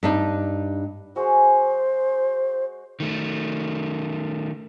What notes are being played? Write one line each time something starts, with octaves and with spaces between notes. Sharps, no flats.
G2 D4 D#4
G#3 F#4 C5
D#3 A3